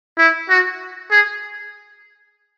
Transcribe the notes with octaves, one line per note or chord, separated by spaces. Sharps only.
E4
F#4
G#4